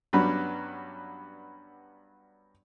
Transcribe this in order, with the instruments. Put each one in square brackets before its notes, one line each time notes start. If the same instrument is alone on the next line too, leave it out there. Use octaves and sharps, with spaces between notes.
[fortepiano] G2 F#3 G3 B3 C#4 B5